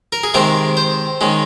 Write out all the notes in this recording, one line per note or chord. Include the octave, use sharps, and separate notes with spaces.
A#4
G#4
C3 D#3 G#3 C4 A#4
C5
D#3 G#3 C#4